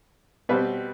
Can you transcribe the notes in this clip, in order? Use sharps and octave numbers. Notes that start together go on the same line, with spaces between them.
B2 G3 C4 B4